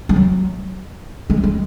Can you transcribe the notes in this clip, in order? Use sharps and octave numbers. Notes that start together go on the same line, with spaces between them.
G#3
F#3
G#3
G#3